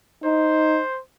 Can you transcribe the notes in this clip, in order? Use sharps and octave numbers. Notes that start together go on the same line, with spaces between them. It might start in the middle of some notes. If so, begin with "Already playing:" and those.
D#4 C5